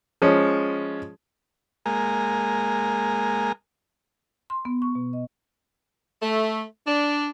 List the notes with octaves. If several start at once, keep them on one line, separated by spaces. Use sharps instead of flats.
F3 G#3 C#4
G#3 A#3
C6
B3
C#6
B2
D#5
A3
D4